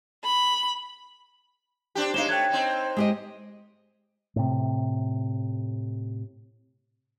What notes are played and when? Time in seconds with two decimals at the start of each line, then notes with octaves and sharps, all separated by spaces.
0.24 B5
1.95 C4 D4 G4
2.14 G#3 D#4 C5 C#5 F5 E7 G7
2.29 A3 G5 F#6 G#6
2.50 C4 D#4
2.96 G#3 G4 D#5
4.36 A2 C3